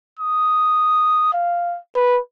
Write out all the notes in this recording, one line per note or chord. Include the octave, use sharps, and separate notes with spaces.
D#6
F5
B4